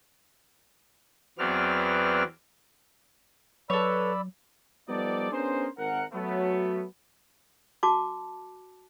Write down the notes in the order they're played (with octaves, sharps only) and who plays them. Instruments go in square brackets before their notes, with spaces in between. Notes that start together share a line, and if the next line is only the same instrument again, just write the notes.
[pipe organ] E2 F#3 B3 C4 D5 F6
[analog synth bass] F#3 [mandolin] A4 C#5 [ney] B4 [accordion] D5 B5 E6
[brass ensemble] F3 G3 B3 D#4 A4 D5
B3 C#4 D4 G#4 A#4 C5
G#1 A#4 F#5
F#3 A3 B3
[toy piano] F#4 A5 D6